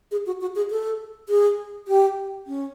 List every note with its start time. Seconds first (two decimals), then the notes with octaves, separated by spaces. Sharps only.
0.11 G#4
0.26 F#4
0.41 F#4
0.55 G#4
0.71 A4
1.29 G#4
1.88 G4
2.47 C#4